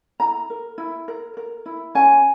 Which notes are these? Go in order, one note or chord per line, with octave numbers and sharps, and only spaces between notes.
E4 A#5
A#4
E4
A#4
A#4
E4
C#4 G#5